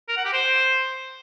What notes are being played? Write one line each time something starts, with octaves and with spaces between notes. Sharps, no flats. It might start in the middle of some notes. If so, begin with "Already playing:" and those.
A#4
F#5
G4
C5